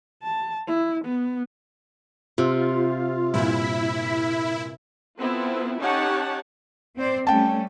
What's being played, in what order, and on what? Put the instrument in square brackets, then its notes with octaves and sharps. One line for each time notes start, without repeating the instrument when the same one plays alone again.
[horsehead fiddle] A5
E4
B3
[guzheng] C3 [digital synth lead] F4
[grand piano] G2 A#2 [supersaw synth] E4
[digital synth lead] B6
[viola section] B3 C4 E4 F4 A4
C#4 D#4 G4 C#5 F#5 A5
[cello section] C4 C5 D5
[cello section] G3 A3 C#4 [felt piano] G5 A5